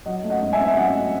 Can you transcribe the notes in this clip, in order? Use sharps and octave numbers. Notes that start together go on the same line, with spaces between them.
F#3 D#5 F#5
A3
D#5 F#5
G#2
E5 G#5
C4
E5
F#3 D#5 F#5
A3